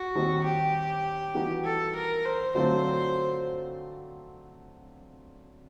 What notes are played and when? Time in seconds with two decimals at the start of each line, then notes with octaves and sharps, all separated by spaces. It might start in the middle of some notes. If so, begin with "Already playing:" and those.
Already playing: F#4
0.15 D#2 D#3 G3 C4
0.45 G4
1.34 E3 G3 B3 D#4 F#4
1.64 A4
1.95 A#4
2.25 C5
2.55 D3 F#3 A3 C4 F4 C5